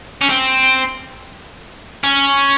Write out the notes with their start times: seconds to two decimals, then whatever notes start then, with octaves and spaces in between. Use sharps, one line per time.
0.21 C#4
0.29 C4
2.04 C#4